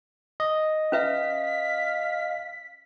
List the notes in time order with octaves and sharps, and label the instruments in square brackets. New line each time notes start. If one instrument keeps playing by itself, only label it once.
[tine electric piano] D#5
[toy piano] C#4 B4 E5 [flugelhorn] F5 [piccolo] B6